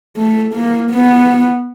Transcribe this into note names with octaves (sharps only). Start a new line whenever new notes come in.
A3
A#3
B3